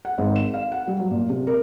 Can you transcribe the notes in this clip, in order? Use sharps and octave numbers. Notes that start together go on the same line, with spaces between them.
F#5
G#1
E7
F5
F#5
G3
F#3
A#2
C3
A#4